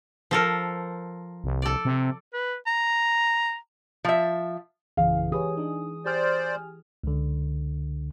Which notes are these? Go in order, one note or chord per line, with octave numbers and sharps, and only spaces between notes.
F3 A4 A#4
C2
A4 D5
C3
B4
A#5
F3 E5
A#1 F#2 C#3 E3 G#4 F5
G4 G#4 B4 C#5 D#6
D4 D#4
G4 C5 D5 G#5 F6
C#2 D3